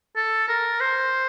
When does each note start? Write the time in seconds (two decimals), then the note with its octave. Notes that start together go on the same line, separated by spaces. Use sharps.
0.16 A4
0.48 A#4
0.80 C5